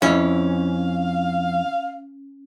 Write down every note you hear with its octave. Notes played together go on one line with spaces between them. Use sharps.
F2 C#4 E4 F5